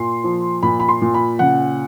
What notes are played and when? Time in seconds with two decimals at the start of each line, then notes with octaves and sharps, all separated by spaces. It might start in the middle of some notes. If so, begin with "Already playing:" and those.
Already playing: A#2 C6
0.24 F3
0.63 A#2 B5
0.80 B5
0.89 C6
1.01 A#2
1.14 B5
1.39 C#3 F#5